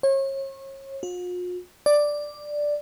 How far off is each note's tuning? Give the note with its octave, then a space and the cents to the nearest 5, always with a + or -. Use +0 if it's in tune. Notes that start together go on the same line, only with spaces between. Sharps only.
C#5 -35
F4 +45
D5 +5